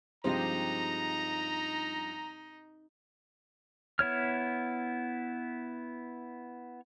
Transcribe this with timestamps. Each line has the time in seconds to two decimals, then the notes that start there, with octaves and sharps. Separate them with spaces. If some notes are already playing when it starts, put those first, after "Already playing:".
0.24 G2 F3 G#3 C4 D#4 G4 C5 A#5
3.99 B3 E4 C#5 F6